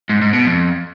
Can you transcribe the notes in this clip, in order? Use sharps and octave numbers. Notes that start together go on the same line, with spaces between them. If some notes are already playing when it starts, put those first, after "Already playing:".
G#2
G#2
B2
F2